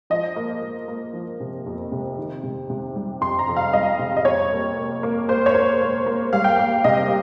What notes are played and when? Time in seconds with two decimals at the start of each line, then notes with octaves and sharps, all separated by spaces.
0.10 F3 D#5
0.36 A#3
0.62 A#3
0.88 A#3
1.14 F3
1.40 C3
1.66 F2
1.92 C3
2.18 D#3
2.43 C3
2.70 C3
2.95 G3
3.21 F2 C6
3.39 A#5
3.47 F2
3.56 F5
3.73 G3 D#5
3.99 C3
4.17 D#5
4.25 F2 C#5
4.51 A#3
4.77 A#3
5.03 A#3
5.29 A#3 C5
5.46 C#5
5.55 A#3
5.81 A#3
6.06 A#3
6.33 G3 F5
6.44 G5
6.56 A#3 F5
6.84 C3 D#5